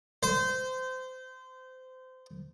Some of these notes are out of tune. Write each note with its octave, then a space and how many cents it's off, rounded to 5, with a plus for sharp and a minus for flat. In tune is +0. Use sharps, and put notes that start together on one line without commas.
C5 -25